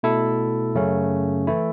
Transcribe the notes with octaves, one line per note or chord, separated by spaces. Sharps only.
B2 A3 E4 A4
F#2 C#3 A3 C#4
E3 A3 E4